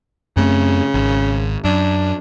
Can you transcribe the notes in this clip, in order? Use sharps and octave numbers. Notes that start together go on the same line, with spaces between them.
F#2 C#3 A3 C4
G#1
F#2 D4